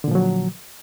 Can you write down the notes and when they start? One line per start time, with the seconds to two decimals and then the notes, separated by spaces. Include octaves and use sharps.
0.04 D3
0.08 A#2
0.11 F3
0.15 F#3